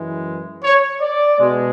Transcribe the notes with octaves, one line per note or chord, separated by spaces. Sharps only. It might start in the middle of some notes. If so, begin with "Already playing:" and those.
Already playing: F#2 E3 G#3
C#5
D5
B2 G#3